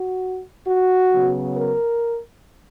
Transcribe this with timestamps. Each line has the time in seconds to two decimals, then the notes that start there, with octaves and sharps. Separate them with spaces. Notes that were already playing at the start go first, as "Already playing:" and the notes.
Already playing: F#4
0.67 F#4
1.12 C#3 F#3 B3
1.57 A#4